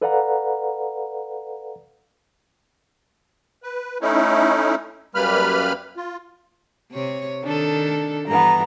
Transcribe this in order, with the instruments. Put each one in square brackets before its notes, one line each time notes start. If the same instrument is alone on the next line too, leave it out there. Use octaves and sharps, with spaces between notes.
[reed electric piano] A4 B4 D5 F5 F#5 A#5
[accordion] B4
A3 C#4 D#4 E4
F#2 G3 A#3 B4 B5 F6
F4
[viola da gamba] C3 C#5
[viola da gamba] D#3 A4 [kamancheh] D4
[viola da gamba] G2 E3 [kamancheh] B3 A#5